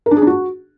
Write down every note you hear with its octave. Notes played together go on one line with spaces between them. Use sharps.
A#4
D4
G#4
D4
F#4